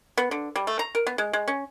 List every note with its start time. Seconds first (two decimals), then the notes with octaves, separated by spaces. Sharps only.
0.18 B3
0.31 D3
0.56 G3
0.67 A3
0.79 A#5
0.95 A#4
1.07 B3
1.18 G#3
1.33 G#3
1.48 C#4